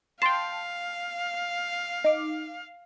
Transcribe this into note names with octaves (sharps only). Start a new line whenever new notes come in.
F5 G5 A5 C6 C7
D#4 D6